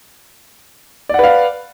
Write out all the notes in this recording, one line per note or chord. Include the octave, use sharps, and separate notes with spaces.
B4 D5 F5 F#5